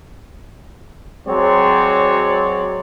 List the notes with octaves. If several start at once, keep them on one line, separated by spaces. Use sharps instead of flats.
F#3 G#3 C4 F#4 C#5 D5